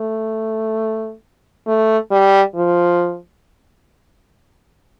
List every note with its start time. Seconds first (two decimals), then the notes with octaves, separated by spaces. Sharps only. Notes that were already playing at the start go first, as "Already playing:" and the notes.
Already playing: A3
1.67 A3
2.11 G3
2.55 F3